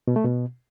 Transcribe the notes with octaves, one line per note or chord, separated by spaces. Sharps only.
B2
A3
B2